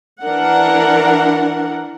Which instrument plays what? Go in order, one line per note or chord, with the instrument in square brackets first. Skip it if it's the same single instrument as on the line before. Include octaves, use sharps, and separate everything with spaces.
[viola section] E3 D4 A#4 F#5